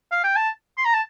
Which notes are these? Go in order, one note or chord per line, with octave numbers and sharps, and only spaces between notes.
F5
G5
A5
C6
A#5
A5